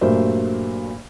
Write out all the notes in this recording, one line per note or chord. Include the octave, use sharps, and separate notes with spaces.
G2 A#2 F#3 A3 A#4 C5